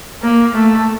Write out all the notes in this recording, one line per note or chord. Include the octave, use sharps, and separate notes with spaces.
A#3
A3